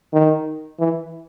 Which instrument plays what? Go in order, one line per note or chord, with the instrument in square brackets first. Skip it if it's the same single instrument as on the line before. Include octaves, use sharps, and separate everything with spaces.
[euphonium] D#3
E3